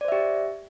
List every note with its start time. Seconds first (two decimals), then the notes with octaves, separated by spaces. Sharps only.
0.01 D5
0.05 C5
0.08 E5
0.12 G4